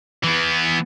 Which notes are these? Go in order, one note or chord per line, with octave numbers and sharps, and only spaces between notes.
E3 B3